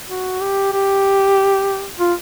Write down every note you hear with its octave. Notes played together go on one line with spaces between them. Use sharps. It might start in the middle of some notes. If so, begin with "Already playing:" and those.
F#4
G4
G4
F4